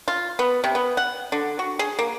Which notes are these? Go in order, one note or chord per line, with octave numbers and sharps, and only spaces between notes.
F4
B3
C3
B3
F#5
D3
F#4
G#4
A#3